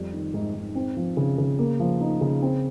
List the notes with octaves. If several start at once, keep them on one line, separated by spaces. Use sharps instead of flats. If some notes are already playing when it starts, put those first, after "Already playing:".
Already playing: F2 G3
D#3
G#2
G#2
C4
F3
C#3
C#3
A#3
F3
D#4
C#3
C4